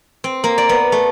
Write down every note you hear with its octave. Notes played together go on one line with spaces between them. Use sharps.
C4
A#3
D5
B3
A3